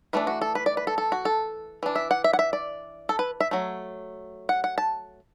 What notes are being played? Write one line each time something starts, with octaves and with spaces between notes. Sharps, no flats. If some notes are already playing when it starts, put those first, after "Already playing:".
E3 A3 D4 B4
F#4
A4
B4
D5
B4
A4
A4
F#4
A4
E3 D4
E5
F#5
E5
F#5
E5
D5
A4
B4
E5
F#3 A3
F#5
F#5
A5